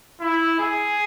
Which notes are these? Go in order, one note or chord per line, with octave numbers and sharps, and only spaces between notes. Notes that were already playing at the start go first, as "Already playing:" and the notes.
E4
G#4